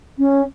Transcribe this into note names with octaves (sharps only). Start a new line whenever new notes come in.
C#4